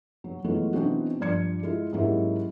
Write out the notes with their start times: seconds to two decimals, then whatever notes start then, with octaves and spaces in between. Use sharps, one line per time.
0.24 F#3
0.44 E3 F#3 G#3 A3 B3 F4
0.73 B2 E3 C4 D4 D#4 F#4
1.20 G2 F3 D5 G#6 C#7
1.63 G#3 E4 F4
1.93 G#2 F#3 A#3 C#4 E4 G4